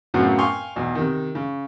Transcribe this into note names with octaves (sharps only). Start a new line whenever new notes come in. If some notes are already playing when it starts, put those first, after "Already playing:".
F#2 A2 C#3 F#3 B3 C4
F5 G5 G#5 C6 C#6
B1 E2
C3 D#3
C#3